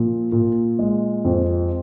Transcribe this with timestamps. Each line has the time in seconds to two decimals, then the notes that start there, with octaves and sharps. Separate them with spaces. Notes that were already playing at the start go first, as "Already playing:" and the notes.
Already playing: A#2 F3
0.32 A#2
0.79 G#3
1.25 F2